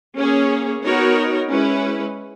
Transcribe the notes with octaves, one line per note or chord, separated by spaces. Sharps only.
A#3 C#4 G#4 C#5
B3 D#4 F#4 A#4 C#5
G#3 C#4 E4 B4